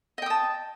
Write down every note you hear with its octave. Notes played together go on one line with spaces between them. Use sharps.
D#5 G5 A5 D#6